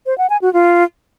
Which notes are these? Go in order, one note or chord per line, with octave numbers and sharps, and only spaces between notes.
C5
F#5
G#5
F#4
F4